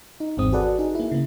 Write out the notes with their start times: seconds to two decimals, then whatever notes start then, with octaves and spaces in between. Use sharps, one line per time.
0.20 D#4
0.37 G#1 E2 G#3 C4 D#6
0.52 F#4 G#4 A4 B4 D5 F#5
0.79 D#4 G#4
0.95 A#3 E4
1.11 C#3 A#3